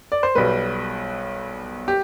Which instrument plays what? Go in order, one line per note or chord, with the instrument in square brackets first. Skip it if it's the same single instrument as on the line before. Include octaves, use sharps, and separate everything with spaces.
[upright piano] D5
C5
B1 B2 G3 B4
G4